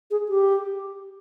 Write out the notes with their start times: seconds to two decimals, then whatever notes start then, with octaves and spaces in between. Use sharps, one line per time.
0.11 G#4
0.29 G4